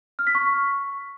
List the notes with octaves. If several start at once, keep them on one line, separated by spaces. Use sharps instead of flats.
F6
B6
C#6